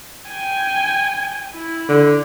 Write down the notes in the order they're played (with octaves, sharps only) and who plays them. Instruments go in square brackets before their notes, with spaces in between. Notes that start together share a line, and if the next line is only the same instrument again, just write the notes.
[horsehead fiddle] G5 G#5
E4
[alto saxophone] D3